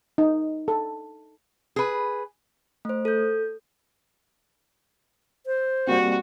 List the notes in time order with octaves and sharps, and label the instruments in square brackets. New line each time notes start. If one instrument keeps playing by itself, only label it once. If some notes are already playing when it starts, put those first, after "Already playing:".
[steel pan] D#4
A4
[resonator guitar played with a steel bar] G#4 B4
[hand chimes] A3 C5
A4 G6
[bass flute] C5
[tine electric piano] G3 A#3 C4 [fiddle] F#4